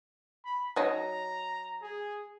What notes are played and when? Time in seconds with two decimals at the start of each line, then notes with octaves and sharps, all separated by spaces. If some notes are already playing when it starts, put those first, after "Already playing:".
0.45 B5
0.76 F#3 D#4 A#5
1.82 G#4